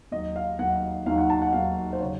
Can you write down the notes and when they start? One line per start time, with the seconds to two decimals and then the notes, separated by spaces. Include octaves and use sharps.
0.11 D#2 D#3 F#3 D#5
0.36 F5
0.59 D#2 D#3 F#3 F#5
1.06 D#2 D#3 F#3 F5
1.18 F#5
1.30 A5
1.42 F#5
1.53 D#2 D#3 F#3 F5
1.93 C5
2.00 C#3 F#3 C#5